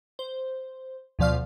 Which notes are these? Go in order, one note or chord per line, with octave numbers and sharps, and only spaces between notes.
C5
D2 B2 F3 D5 F5 F6